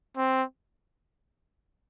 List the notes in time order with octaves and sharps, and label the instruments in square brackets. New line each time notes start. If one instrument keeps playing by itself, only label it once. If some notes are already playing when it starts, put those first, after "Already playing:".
[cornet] C4